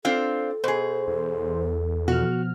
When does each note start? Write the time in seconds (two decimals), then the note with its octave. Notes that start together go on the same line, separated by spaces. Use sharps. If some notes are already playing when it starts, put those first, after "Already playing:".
0.05 C4 D4 F4 A4
0.64 B2 G#4 C5
1.08 E2
2.08 B2 F3 F#4 F6